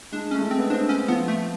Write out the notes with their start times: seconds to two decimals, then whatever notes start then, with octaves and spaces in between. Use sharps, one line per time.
0.12 G#3 D4
0.31 C#4
0.34 A3
0.41 G#3
0.51 C4
0.59 B3
0.70 C4 D4
0.89 B3 C#4
1.08 F3 B3
1.28 A3